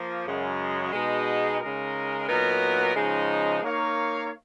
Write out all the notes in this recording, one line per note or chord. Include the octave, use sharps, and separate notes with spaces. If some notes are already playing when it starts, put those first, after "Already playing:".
Already playing: F3 A#3
F#2 C#3 G#3
B2 G#3 D#4
C#3 G#3 D#4 A#4
A#2 F#3 B3 D#4 A#4
C#3 F3 G#3 D#4
A#3 D#4 A#4 C#5 F5